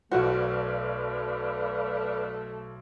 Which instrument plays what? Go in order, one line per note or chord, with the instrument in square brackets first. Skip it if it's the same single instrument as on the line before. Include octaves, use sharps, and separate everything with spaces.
[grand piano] B1 C5 [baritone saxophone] A3 [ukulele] F#4 [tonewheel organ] B4 D5 F5